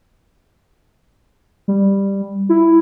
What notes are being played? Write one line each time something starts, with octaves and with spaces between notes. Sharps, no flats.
G3
E4